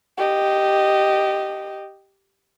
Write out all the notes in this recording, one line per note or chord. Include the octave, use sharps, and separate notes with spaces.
G4 D#5